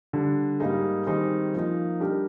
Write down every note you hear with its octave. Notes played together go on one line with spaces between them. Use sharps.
D3 G3 D4
G#2 G3 A#3 D#4 G#4
D#3 G3 C4 D#4 G#4
F3 A#3 D#4
G3 D4 G4 A#4